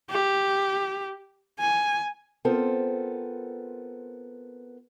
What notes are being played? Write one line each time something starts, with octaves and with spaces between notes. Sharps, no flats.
G4
G#5
B3 C4 F4 A4 A#4 C5